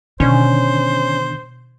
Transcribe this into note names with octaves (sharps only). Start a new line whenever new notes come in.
B2 D3 D#3 C#4 D4 C5